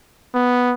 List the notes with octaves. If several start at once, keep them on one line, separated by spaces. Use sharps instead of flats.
B3